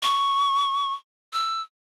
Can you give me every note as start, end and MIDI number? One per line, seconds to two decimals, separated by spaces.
0.03 0.93 85
1.33 1.61 88